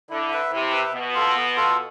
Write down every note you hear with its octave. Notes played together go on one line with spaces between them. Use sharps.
D3 E4
B4 E5
C3 E4
B4 E5
B2 B3
F4 A4
B3
F4 A4